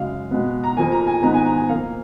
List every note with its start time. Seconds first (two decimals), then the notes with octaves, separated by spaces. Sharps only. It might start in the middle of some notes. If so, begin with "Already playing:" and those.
Already playing: F#2 C#3 G#3 F5
0.31 B2 G#3 B3
0.64 A#5
0.77 F2 F3 A#3 G#5
0.92 A#5
1.07 G#5
1.22 G#2 D#3 G#3 B3 A#5
1.34 G#5
1.45 A#5
1.57 G#5
1.69 A#2 F3 A#3 F5